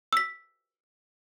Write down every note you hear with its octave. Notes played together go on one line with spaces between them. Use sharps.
E6 B6